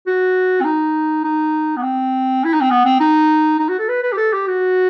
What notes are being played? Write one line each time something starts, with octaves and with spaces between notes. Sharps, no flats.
F#4
C4
D#4
D#4
B3
C4
E4
D#4
C4
B3
C4
D#4
D#4
F#4
A4
B4
B4
G4
A4
G4
F#4